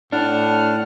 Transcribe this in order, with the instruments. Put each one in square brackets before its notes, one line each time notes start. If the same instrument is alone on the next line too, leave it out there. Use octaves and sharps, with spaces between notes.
[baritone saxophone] A2 [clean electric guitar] D4 [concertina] F#5 F6